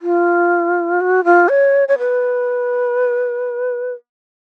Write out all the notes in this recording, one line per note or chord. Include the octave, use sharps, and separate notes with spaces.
F4
F#4
F4
C#5
C#5
B4